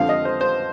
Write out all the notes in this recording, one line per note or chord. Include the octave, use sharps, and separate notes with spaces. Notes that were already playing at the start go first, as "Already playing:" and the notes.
Already playing: F2 D3 F3 F5
D#5
C5
C5